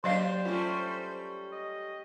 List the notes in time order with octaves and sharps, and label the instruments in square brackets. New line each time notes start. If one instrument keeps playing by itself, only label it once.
[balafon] F#3 D#5 F5 [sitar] A#3 D4 G4 [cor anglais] C5
[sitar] G3 A3 C#4 [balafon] F4
[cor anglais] D#5